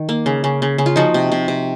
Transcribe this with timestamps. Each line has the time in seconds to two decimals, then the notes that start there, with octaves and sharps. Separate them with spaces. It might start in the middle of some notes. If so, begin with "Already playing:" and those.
Already playing: D#3
0.09 A#3
0.26 C#3
0.44 C#3
0.62 C#3
0.78 C#3
0.86 F4
0.96 F3 D#4 F#4
1.14 C3
1.32 C3
1.48 C3